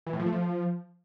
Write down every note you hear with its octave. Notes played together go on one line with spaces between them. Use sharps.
E3
A2
F3
A3
F3